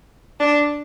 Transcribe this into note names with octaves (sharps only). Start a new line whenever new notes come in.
D4